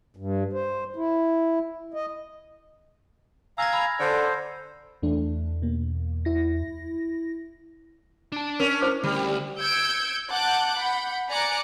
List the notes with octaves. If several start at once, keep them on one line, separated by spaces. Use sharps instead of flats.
G2
C5
E4
D#5
F5 G#5 A#5 E6 G#6 A#6
B5 E6 F6
D3 C5
E2 E3 A3 D4
B2 A#3
E4 A#6
D4 A5
C#4 A#4
E4 C5 D6
D2 G3
E6 G6 G#6 C#7 D7
F#5 A5 D6 F#6 G6
F#5 B5 G6
D5 G#5 A#5 D6 F#6 C#7